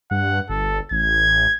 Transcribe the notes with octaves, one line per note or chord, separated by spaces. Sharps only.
G2 F#5
G1 A4
A1 G#6